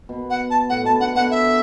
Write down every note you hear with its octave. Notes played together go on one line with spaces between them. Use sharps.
B2
F#5
A5
A2 F#5
B2 A5
D3 F#5
B2 F#5
E5